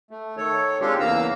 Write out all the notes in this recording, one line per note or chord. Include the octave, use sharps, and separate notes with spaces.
A3
D#3 A4 C#5
G#3 C4 D4 F4 G4 A4
E2 C#3 A#3 F5 A#5 E6